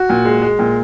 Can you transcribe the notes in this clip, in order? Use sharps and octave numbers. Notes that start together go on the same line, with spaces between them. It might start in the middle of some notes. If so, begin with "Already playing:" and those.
Already playing: F#4
A#2
G#3
G#3
A#2